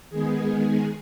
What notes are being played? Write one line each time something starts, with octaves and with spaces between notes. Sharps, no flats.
D#3 G#3 B3 G#4